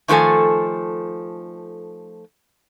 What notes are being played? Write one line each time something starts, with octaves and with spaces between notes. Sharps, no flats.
D#3 F3 A3 A4 G#5